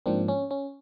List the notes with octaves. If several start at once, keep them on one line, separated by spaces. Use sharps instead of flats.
G#2 F3 A#3 C4 D4
C#4
C#4